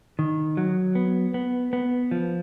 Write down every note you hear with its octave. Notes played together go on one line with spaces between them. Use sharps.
D#3
F#3
B3
B3
B3
F3